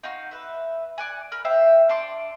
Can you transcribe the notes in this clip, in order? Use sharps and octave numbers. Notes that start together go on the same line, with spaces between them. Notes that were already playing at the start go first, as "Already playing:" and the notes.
D#4 F4 F#4
B4 E5
D5 F#5 G#5
A#4 B5 F6
C5 E5 F5 G5
D4 A5 C6 D6